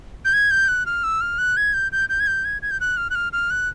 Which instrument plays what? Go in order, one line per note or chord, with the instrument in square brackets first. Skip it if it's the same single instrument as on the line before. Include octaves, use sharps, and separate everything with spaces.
[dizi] G6
G#6
G6
F#6
F6
E6
F6
F#6
G#6
G6
G6
G6
G#6
G6
G#6
G#6
G6
F#6
F6
F#6
F6
F6
F#6